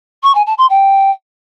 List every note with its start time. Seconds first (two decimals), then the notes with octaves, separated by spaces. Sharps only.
0.23 C#6
0.35 G#5
0.46 A5
0.58 C6
0.70 G5